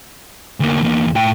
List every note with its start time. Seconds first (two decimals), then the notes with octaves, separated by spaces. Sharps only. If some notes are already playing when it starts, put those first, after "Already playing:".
0.60 D2 A#3
0.82 E2 A#3
1.15 A2 G5